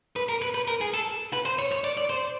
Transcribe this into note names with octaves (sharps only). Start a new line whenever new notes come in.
B4
A#4
B4
B4
A#4
G#4
A4
B4
C5
C#5
C#5
D5
D5
C5